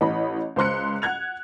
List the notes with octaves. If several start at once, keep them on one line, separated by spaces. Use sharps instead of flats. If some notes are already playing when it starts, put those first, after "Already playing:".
A1 E3 D#5 B5
C#2 C5 C6 F#6 C#7
F#5 F#6 G#6 F7